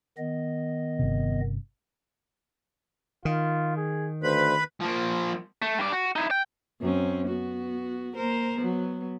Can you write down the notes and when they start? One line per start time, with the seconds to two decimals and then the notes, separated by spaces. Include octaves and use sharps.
0.18 D#3 B3 D#5
0.99 G1 C3
3.25 D#3 F4
3.77 G#4
4.23 D2 B4 C5 B5
4.80 F3 A#3
5.62 A3
5.78 G2 D5
5.92 F#4
6.16 D#4 E4
6.31 G5
6.81 F#2 C4 C#4
7.27 B3 F#4
8.15 A#3 A#4 C5
8.57 F#3 B3